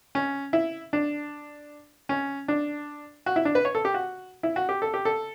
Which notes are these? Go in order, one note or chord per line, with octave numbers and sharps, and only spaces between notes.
C#4
E4
D4
C#4
D4
F#4
E4
D4
B4
C#5
A4
G4
F#4
E4
F#4
G4
A4
G4
A4